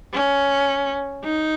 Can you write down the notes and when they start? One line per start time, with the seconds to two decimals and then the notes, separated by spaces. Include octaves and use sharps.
0.13 C#4
1.24 D#4